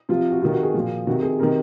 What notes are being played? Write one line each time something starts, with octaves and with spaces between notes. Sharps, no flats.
C3 F3 F4
F#4
C3 D#3 F4
F#4
G#4
A#2 F3
C3 D#3 F#4
G#4
C3 D#3 A#4